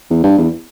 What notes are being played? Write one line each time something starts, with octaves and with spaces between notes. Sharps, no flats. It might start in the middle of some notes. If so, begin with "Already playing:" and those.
E2
G2
E2